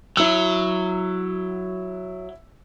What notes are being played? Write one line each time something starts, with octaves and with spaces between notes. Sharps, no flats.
F#3 E4 E6